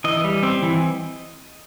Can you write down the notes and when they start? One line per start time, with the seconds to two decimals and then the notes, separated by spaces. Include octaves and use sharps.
0.04 E3 D#5
0.24 G3
0.43 C4
0.62 E3